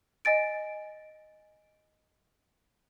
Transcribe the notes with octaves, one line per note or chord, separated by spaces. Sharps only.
D#5 G#5 A6 D7